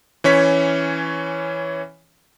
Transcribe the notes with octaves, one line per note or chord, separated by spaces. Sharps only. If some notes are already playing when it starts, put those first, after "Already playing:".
E3 C#4 C#5 B6